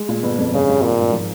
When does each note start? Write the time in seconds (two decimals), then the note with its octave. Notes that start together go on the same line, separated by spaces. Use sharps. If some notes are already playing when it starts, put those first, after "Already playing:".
Already playing: G#3
0.09 A#2
0.23 G1
0.38 F2
0.53 G2 C#3
0.68 G2
0.82 G#1 A#2
0.98 G#2
1.12 F3